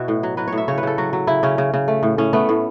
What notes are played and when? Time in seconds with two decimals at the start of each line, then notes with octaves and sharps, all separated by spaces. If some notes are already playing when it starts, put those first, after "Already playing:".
Already playing: B2 E4 F#4
0.08 A2
0.23 F#3
0.37 F#3 B4
0.48 A2 C#5
0.58 E5
0.68 C#3 C#5
0.78 B4
0.83 C#3 A4
0.98 F#3 F#4
1.13 F#3
1.27 C#3 E4
1.43 C#3 C#4
1.58 C#3
1.74 C#3
1.88 A3
2.03 A2
2.18 A2 C#4
2.33 A3 B3
2.49 A2